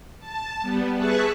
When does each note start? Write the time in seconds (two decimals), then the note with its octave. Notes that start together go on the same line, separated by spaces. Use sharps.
0.19 A5
0.61 G3 B3
0.95 G#4 B4 E5 A5 C#6 F#6